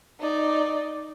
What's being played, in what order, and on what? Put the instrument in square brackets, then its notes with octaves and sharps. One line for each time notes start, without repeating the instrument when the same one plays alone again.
[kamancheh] D#4 D5